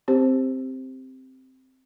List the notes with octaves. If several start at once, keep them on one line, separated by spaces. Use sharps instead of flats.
C4 G4 C5